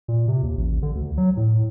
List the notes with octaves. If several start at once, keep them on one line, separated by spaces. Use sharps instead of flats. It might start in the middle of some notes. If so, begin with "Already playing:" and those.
A#2
C3
D#2
A1
D3
D2
F#3
A2